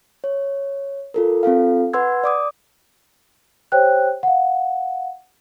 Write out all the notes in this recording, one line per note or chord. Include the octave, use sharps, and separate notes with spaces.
C#5
F4 A4 A#4
C4 F4 A4 F5
B4 F#5 C6 E6 G#6
D5 D6 D#6
G4 C5 C#5 G5 F#6
F5 F#5